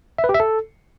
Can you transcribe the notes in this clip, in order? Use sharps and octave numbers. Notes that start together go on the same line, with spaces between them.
E5
B4
G4
E5
A4